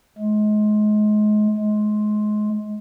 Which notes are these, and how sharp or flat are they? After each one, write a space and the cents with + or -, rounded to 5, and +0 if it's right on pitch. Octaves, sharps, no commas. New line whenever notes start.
G#3 +30
G#3 +25